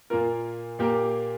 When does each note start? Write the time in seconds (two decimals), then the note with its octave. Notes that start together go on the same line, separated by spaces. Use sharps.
0.10 A#2 A#3 F4 A#4
0.79 A#2 A#3 G4 A#4